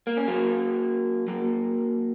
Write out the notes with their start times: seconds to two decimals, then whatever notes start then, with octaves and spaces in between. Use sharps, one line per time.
0.07 A#3
0.17 C#4
0.28 F#3 A#3
1.28 F#3 A#3